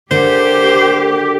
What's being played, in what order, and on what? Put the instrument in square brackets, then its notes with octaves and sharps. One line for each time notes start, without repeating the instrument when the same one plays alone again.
[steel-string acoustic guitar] D3 A4 [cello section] G4 [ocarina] A#4 [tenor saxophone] C5